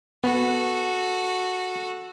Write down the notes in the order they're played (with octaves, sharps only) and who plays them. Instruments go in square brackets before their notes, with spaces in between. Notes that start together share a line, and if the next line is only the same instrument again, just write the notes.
[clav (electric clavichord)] B3 [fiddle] F#4 A4